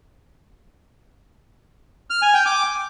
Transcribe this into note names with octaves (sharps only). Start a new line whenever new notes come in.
F6
G#5
G5
D6